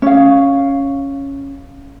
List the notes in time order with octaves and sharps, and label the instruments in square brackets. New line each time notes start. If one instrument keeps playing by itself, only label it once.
[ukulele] C#4 F5